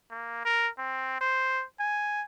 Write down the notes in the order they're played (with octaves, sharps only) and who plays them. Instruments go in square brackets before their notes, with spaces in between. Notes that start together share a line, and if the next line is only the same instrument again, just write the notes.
[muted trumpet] A#3
A#4
C4
C5
G#5